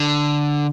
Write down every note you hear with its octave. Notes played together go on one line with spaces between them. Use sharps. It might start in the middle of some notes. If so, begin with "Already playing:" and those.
Already playing: D3